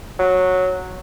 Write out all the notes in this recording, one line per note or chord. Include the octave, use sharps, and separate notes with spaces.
F#3